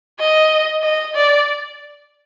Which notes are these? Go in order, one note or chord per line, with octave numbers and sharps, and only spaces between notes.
D#5
D#5
D5